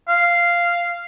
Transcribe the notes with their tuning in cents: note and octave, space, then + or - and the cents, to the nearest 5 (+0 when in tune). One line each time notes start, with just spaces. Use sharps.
F5 -10